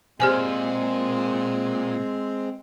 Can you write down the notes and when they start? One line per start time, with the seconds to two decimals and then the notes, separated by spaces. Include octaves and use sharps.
0.20 A#2 G#3 C4 G4 C5 G#5